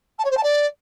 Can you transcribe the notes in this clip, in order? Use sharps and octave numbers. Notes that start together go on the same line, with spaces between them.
A5
C#5
C5
A5
D5